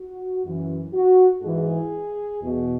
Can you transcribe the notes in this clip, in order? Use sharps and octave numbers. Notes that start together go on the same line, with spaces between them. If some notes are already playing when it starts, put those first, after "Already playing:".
Already playing: F#4
F#2 E3
F#4
G#2 E3 G#4
E2 B2